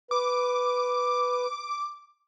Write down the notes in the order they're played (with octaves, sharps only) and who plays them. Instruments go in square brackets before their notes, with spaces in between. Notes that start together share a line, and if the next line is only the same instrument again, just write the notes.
[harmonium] B4 [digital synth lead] D6